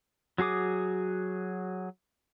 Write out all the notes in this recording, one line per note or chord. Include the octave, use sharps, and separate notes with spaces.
F#3 F#4 G#4 D6 D#6